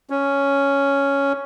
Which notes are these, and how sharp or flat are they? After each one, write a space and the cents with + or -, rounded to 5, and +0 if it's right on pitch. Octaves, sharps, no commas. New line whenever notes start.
C#4 +5